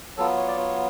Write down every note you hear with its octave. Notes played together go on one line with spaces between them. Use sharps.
F#3 B3 F4 A4
C#5
D5
C#5